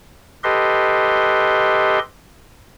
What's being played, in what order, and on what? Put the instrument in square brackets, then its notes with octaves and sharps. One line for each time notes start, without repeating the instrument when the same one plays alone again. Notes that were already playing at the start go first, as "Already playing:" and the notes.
[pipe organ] G4 A4 B4 D#5 C6